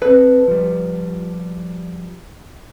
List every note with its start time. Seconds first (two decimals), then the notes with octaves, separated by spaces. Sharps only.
0.02 C4 A4 B4
0.48 F3 G3